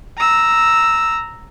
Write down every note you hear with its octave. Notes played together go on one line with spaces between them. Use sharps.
A#5 E6